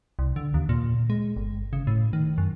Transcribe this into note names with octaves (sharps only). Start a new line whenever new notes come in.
C2
D3
D#2
A#2
G#3
G1
C#3
A2
D#3
F#2